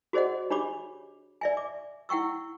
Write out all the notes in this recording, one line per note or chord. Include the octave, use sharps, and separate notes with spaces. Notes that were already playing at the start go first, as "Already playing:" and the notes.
F#4 G#4 C5 D5 D#5 F#5
D4 G4 C#5 B5 D6
D5 E5 G#5
D6
E4 F#5 G5 C#6 E6